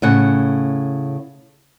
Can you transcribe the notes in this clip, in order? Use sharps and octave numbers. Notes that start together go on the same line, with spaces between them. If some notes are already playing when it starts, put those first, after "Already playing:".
A2 C#3 F#5